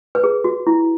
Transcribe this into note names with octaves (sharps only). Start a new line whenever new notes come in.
B4
G#4
F#4
E4